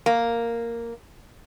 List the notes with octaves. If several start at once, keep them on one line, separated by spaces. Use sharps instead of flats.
A#3